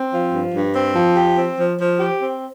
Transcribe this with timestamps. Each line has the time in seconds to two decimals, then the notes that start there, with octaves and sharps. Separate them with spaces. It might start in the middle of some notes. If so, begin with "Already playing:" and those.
Already playing: C4
0.11 F3
0.32 G2
0.53 G2
0.75 C4
0.95 F3
1.16 G4
1.37 C4
1.58 F3
1.79 F3
2.00 G4
2.21 C4